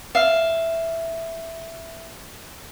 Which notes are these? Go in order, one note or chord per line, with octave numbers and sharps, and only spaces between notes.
E5 F5